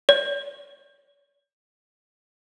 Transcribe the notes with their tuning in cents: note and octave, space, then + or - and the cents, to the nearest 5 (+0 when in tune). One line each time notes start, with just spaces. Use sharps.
C#5 +40